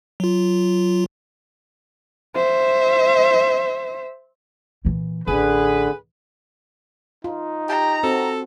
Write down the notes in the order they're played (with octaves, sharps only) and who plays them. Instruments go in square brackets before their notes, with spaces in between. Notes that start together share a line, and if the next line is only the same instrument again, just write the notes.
[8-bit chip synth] F#3 F4
[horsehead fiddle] C5 E5
[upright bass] A#2 E3
[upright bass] A1 [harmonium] D3 [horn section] G#4 B4
[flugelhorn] D#4 [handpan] F4
[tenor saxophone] G4 [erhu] A#5
[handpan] C4 F#4 [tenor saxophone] A4